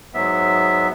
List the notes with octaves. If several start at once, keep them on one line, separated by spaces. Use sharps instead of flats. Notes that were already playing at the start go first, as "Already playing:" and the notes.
G#2 F#3 B3 E5